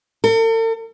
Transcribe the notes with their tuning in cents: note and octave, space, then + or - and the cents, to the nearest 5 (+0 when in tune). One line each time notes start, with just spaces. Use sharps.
A4 +45